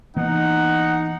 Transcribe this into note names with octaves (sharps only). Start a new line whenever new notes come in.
E3 A#3 B3 D#4 F#5